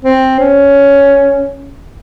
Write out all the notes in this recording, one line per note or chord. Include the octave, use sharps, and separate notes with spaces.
C4
C#4